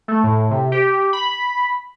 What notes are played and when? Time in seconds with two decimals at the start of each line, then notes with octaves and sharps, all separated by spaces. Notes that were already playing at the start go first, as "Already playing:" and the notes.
0.08 A3
0.24 A2
0.51 C3
0.72 G4
1.13 B5